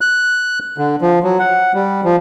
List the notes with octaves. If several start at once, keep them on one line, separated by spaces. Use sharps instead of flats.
F#6
D3
F3
F#3
F#5
G3
F3